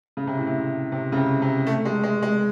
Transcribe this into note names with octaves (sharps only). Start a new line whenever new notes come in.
C#3
C3
A2
C3
C3
C#3
C3
C3
A3
G#3
G#3
G#3